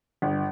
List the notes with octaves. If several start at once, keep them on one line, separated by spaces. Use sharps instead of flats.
G1